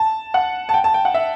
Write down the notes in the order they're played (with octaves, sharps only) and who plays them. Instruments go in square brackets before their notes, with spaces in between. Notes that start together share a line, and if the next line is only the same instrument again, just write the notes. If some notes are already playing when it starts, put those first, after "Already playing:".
Already playing: [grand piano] A5
F#5
A5
G5
A5
G5
F#5
E5